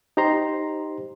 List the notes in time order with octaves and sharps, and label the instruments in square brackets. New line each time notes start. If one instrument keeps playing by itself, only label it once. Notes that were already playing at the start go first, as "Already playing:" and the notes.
[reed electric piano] D#4 G4 C5 A#5 C6